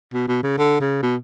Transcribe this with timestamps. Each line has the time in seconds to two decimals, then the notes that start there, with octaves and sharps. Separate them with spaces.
0.13 B2
0.28 B2
0.43 C#3
0.58 D3
0.80 C#3
1.03 B2